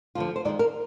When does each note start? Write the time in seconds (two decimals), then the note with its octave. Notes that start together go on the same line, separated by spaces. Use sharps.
0.15 D2 D3 F3 F4
0.36 C5
0.45 D#2 D#3 G#3 D5
0.59 A#4